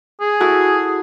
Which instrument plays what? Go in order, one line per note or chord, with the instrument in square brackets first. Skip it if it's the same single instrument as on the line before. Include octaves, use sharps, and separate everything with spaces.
[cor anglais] G#4
[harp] E4 F#4 A4